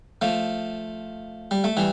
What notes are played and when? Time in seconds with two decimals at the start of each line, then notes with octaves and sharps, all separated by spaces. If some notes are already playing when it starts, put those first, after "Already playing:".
0.22 F3 A3
1.51 G3
1.64 A3
1.77 E3 G3